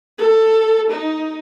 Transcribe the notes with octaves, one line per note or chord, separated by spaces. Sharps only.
A4
D#4